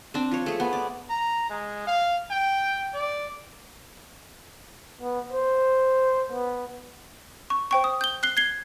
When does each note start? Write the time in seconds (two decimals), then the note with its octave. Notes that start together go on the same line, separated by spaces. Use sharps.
0.14 C4 D4
0.32 F3 C#5
0.46 A3 G#4
0.60 B3
0.73 D5
1.10 A#5
1.50 G#3
1.87 F5
2.31 G5
2.94 D5
5.01 B3
5.32 C5
6.32 B3
7.50 C#6
7.71 C5 G5 C#6
7.84 D#6
8.01 G6 G7
8.23 F#6 C7 G7
8.37 G#6 C7 G7